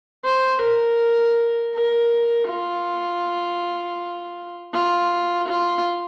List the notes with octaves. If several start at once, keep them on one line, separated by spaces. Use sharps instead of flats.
C5
A#4
A#4
F4
F4
F4